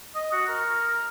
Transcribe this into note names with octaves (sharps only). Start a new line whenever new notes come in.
D#5
F#4
A#4